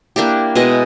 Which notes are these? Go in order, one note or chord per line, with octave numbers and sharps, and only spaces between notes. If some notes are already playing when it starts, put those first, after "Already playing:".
A#3 D4 E4 G4
B2 G#3 E4 D#5